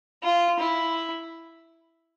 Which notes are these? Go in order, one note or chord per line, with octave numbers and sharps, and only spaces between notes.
F4
E4